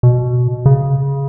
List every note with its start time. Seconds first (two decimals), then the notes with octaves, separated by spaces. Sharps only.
0.03 B2
0.66 C#3